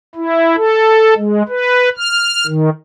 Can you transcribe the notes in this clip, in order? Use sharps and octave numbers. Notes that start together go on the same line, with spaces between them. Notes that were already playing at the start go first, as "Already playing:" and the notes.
E4
A4
G#3
B4
F6
D#3